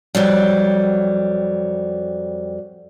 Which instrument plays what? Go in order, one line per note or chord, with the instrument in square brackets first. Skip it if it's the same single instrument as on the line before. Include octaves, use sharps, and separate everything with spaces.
[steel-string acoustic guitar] F2 F#3 G3